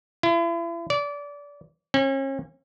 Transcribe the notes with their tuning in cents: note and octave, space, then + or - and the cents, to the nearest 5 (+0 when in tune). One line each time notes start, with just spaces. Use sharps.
E4 +40
D5 -25
C#4 -40